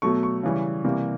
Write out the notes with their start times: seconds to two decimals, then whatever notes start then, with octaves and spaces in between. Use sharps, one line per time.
0.02 B2 F#3 A3 C#6
0.23 C#6
0.43 C#3 E3 G3
0.84 C3 E3 G3 A#3